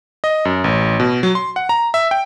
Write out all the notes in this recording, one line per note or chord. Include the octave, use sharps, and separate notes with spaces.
D#5
F#2
A1
B2
F#3
C6
F#5
A#5
E5
G5